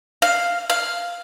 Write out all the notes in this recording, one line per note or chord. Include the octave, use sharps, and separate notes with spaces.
F5
F5